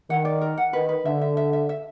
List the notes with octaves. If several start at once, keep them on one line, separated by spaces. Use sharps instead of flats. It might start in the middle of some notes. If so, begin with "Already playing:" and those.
D#3 F#5
D5
A#4
F#5
D#3 B4
B4
D3 E5
E5
E5
E5
E5